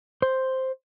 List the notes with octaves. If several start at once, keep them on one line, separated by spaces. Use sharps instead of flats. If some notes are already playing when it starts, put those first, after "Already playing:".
C5